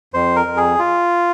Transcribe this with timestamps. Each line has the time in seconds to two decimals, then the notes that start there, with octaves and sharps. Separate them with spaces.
0.14 F2 C5
0.36 A#4
0.47 F2
0.57 G#4
0.79 F4